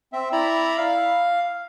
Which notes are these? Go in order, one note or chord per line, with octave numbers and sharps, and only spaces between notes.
C4 E5
E4 D5 E5 A#5 B5
F5